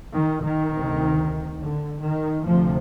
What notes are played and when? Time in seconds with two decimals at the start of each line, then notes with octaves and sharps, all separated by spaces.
0.14 D#3
0.44 D#3
0.72 D2 C3
1.59 D3
2.02 D#3
2.44 D2 C3 F3